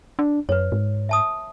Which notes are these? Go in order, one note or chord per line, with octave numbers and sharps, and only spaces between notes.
D4
F#2 B4 C#5
G#2
E5 A5 D#6